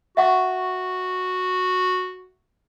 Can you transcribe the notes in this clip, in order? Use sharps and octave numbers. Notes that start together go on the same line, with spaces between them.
F#4 E5 F#5 C#6